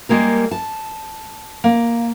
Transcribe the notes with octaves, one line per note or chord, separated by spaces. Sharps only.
G3 G#3 A#3 A#4
A5
A#3